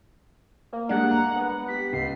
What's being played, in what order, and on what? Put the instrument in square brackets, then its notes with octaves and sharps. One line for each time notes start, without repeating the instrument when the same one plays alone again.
[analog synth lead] A#3
[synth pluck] G3 G#3 D4 [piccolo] F#5
[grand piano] A#5
[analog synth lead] B3
[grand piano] G4 [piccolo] B6
[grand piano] C#2 [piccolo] C7